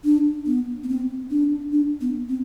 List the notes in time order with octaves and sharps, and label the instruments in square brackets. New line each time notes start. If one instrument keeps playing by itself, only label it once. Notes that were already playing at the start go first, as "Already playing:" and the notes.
[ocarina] D4
B3
B3
C4
D4
D4
B3
C4